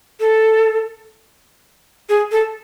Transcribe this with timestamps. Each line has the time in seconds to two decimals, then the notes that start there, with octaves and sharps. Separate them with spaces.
0.20 A4
2.09 G#4
2.32 A4